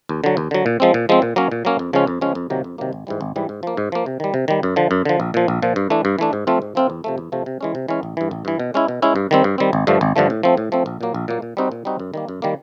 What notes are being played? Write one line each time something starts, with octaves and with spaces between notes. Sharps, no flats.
D#2
D3 F#3
D#2
D3 F#3
A#2
F3 G#3 C4
A#2
F3 G#3 C4
A#2
F#3 A#3 C#4
A#2
F#3 A#3 C#4
F2
C#3 F3 G#3 C#4
F2
C#3 F3 G#3 C#4
F2
C3 D#3 F#3 A#3
F2
C3 D#3 F#3 A#3
G#1
G#2 E3 G3
G#1
G#2 E3 G3
G#2
F3 A#3
G#2
F3 A#3
C3
D#3 G3
C3
D#3 G3
F#2
D3 F3
F#2
D3 F3
A#1
A#2 F3
A#1
A#2 F3
G2
E3 A3 D4
G2
E3 A3 D4
G#2
F3 A3 C4 F4
G#2
F3 A3 C4 F4
E2
C3 F3 A3
E2
C3 F3 A3
C3
E3 G#3 C#4
C3
E3 G#3 C#4
A1
G2 E3
A1
G2 E3
B2
G#3 C#4 E4
B2
G#3 C#4 E4
G2
D#3 G3 C4
G2
D#3 G3 C4
G#1
G2 D3 F3 A3
G#1
G2 D3 F3 A3
A2
F3 A3 C4
A2
F3 A3 C4
A#1
A#2 F#3 A#3
A#1
A#2 F#3 A#3
A#2
G3 C4 D#4 F#4
A#2
G3 C4 D#4 F#4
F#2
D#3 G3 A#3
F#2
D#3 G3 A#3